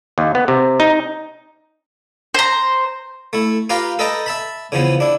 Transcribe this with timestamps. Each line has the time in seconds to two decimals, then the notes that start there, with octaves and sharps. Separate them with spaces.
0.18 D#2
0.35 B3
0.48 C3
0.80 D#4
2.34 C5 A#5
3.33 A3 E4
3.70 F4 G4 B4 F5 G5 A#5
3.99 A4 B4 D#5 G5 A5 A#5
4.26 E5 A5 B5
4.72 C#3 E3 F3 B3
5.00 D4 E4